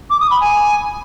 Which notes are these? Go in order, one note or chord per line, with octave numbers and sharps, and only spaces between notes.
D6
D#6
B5
G#5